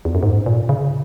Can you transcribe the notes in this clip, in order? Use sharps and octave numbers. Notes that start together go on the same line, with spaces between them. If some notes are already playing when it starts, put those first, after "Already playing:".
E2
F#2
G#2
A#2
C#3